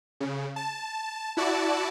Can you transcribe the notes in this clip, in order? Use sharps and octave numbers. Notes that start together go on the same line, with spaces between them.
C#3
A5
E4 F#4 D5 A5